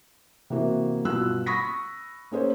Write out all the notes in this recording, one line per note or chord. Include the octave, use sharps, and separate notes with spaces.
C3 E3 A#3 F#4
G2 B2 F4 E6 F#6
B5 C#6 D#6 A#6 B6
A#3 C#4 G#4 C5